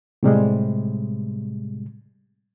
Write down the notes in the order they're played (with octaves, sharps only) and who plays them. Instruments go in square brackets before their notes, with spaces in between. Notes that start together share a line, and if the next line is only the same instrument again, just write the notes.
[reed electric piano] A2 C3 G3 G#3